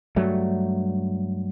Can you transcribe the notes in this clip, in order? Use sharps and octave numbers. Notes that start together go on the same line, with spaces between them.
G2 F#3 G3 A3